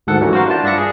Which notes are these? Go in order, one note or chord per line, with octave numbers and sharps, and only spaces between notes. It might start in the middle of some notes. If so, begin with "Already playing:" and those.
D2 G#2 D#3 A4 F#5
E3 F#3 G3 A3 C#4
F#4 A#4 C5 F5
D4 E4 F4 A5
G2 D4 E5 A#6 C#7
G#4